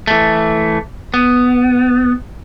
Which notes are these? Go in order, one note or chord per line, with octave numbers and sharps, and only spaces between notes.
E3 A3
B3